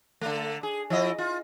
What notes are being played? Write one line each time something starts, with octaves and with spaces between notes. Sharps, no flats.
D3 A3
G#4
F3 E4 D#5
F4